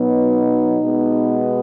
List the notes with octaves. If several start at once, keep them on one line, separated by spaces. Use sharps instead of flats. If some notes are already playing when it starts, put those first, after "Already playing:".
Already playing: B2 F#3 B3 D#4
B2 G#3 B3